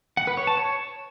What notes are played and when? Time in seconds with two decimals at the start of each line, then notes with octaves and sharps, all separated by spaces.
0.17 F#5
0.27 B4
0.37 C#5
0.47 A5
0.57 C#5